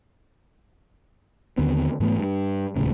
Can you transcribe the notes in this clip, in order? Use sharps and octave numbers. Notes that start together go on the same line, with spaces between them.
D#2 D3 B3 C4
G#2 E3 A3 B3
G2
D#1 C#2 A2 C#3